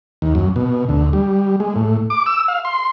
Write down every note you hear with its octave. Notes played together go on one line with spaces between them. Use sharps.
D#2
F#2
B2
D2
G3
G#3
A2
D6
E6
F5
C6